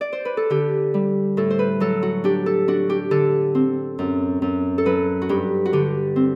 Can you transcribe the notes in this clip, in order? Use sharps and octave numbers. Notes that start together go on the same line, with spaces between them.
D5
C5
B4
A4
D3 G4
G3
A2 A4
C5
B4
F#3 A4
F#4
D4 G4
A4
D4 F#4
G4
D3 A4
C4
F#2
F#2
A4
F#3 B4
F#4
G2 G4
F#4
D3 G4
C4